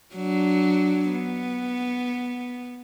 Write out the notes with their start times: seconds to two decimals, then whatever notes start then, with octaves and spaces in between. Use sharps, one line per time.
0.15 F#3 D4
1.13 B3